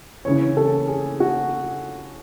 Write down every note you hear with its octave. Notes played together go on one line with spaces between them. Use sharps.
C#3 E3 C#5
A4
G#4
F#4